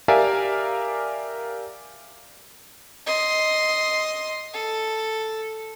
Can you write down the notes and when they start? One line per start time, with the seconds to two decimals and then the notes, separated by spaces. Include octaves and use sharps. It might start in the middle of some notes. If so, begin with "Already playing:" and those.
0.08 G4 A#4 D5 E5 F5 G#5
3.06 D#5 C6
4.54 A4